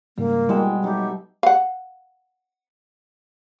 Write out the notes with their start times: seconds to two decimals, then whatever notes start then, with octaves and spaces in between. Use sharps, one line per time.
0.18 G#2 C#3 G3 A#3
0.49 B2 G3 G#3 E4 G4 G5
0.84 F#3 D#4 G4 A4 E5
1.43 F5 F#5